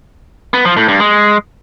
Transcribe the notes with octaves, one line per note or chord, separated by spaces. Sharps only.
B3
F3
A2
G2
G#3